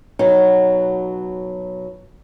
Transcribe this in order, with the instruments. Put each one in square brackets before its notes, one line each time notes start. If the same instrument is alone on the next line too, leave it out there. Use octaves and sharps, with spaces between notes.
[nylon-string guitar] B2 F#3 D#4